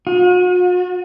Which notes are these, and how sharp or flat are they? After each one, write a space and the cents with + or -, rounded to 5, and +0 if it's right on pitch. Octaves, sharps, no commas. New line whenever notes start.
F#4 -45